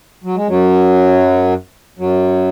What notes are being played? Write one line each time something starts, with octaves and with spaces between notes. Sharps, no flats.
F#3
G#3
F#2 F#3
F#2 F#3